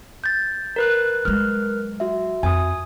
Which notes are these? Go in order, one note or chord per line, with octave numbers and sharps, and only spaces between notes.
G6 A6
A#4 B4 F#6
F#3 G#3 F6
F#4 E5
F2 G#5 D#6